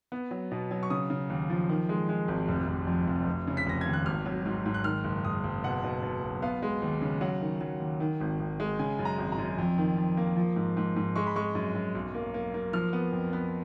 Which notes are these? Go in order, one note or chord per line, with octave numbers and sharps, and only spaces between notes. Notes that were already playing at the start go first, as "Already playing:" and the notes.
B3
F#3
B2
F#3
C#6
C#3 D#6
C#3
D#2
F3
D#3
G#3
G#3
G#1
F1
F1
F2
F1
F1
C#3
B6
F1 A#6
D#2 G#6
F#6
G#1 F6
F#3
G#2
G#2
F#6
D#3 F6
F#1
F#1 D#6
F#1
B2 F#5
B2
B2
B1
B3 F5
G#3
D#2
C#3
F#3 F#5
D#3
F#3
D#2
D#3
G#1
G#1
G#3
C#3 G#5
F#2
A#5
G#1
A#5
F#2
F2
D#3
F2
A#3
F3
G#2
G#2
G#2
G#3 C#6
B5
G#3 C#6
F#2
F#2
B1
A#3
A#3
A#3
F3 F6
B3
F2
B3